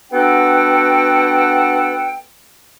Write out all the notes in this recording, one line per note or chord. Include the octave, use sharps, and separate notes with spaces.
B3 D4 F#4 A4 F#5 G5